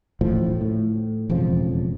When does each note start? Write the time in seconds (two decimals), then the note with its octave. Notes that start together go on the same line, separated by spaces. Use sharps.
0.21 D1 A1 A2 F3
0.61 A2
1.30 E1 F2 C#3 F3